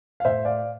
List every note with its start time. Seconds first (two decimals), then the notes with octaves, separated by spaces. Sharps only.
0.20 F5
0.25 A2 C5 E5
0.45 D5 F5